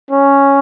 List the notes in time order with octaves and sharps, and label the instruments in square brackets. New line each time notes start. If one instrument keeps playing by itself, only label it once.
[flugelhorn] C#4